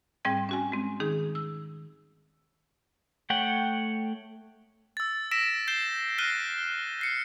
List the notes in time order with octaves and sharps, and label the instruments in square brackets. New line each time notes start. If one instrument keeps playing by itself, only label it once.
[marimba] G#2 G3 C4 G5 G#6
C#4 F#4 G#5
G#3 C4
D#3 D#4 G#4
E6
[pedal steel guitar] A3 C#5 F#5 G5
[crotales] E6 A6
E6 A#6 B6 D7 E7
G6 C7 E7 G7
F6 F#6 A#6 C7 D#7 G7
C7 C#7